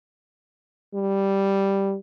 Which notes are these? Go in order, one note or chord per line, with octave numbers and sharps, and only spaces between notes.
G3